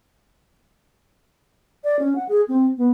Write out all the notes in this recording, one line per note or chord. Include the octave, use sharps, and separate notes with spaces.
D5
C#4
F#5
G#4
C4
B3